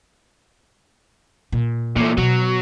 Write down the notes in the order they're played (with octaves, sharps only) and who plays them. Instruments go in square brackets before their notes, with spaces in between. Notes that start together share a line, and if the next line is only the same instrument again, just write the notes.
[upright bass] A#2
[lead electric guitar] A#2 A3 [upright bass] E3
[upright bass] B2 [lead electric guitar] F#3